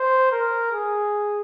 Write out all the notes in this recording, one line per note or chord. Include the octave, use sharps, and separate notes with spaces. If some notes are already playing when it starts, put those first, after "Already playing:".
Already playing: C5
A#4
G#4